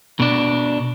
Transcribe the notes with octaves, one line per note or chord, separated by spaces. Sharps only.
B2 D4